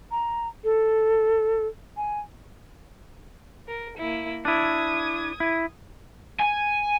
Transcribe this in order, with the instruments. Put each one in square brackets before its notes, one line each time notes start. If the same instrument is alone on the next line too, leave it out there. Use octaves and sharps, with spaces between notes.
[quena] A#5
A4
G#5
[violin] A#4
A#3 E4
[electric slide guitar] D4 E4 [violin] D#6 G#6
[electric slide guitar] E4
[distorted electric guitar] G#5